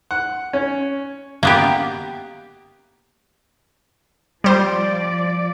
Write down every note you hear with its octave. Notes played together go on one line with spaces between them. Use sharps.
F#5
C#4
A#3 B3 G4
F3 G3 C5 D5